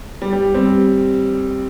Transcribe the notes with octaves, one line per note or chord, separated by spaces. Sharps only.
G3
G3
G3 C4